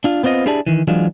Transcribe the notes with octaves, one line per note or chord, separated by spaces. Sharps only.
D4 F4
B3 C4 F4 D5 D#5
D4 E4 G4 G#4 D5 A5
D#3 E3
E3 F#3 G#3 D4 F4